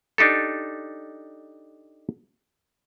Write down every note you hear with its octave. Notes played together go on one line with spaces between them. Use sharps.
D4 D#4 G4 A4